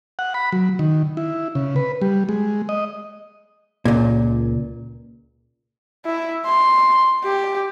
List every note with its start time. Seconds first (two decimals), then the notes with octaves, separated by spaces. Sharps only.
0.19 F#5
0.34 B5
0.52 F#3
0.79 D#3
1.17 E4
1.55 C#3
1.76 B4
2.02 G3
2.29 G#3
2.69 D#5
3.85 C#2 A#2
6.06 E4
6.46 C6
7.24 G4